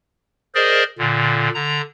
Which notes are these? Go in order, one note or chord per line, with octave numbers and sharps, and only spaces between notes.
G#4 A#4 C5 D5 D#5
A#2 D3
D3 A#5